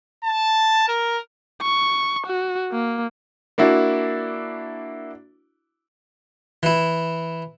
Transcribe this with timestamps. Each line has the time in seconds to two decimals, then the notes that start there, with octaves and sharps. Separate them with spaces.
0.24 A5
0.88 A#4
1.62 C#6
2.27 F#4
2.72 A#3
3.58 A#3 D4 E4 F#4
6.63 E3 E4